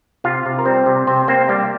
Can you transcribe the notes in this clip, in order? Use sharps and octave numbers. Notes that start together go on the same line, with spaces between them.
C3 F4 F5
C3
A#4
G3 C4 C5
C3
C3 C4 C5
A#3 C4 C5
G3 A#3 G4